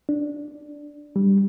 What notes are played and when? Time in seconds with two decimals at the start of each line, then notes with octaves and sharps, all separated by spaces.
0.09 D4
1.16 G3